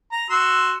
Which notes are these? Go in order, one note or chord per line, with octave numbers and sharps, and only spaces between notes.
A#5
F#4 C6 E6